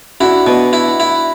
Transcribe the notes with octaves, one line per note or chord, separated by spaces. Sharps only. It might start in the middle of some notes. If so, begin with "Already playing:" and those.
D4 E4 F#4
B2
E4
E4